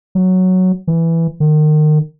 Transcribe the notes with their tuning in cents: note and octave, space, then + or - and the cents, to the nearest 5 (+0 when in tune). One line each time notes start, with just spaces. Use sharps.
F#3 +0
E3 +5
D#3 -30